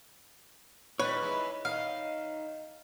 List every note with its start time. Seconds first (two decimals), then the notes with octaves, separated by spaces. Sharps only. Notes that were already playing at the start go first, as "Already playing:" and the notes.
0.99 D#3 G3 B4 C#5
1.22 G#3 D#4 E4
1.65 D#3 D#4 F5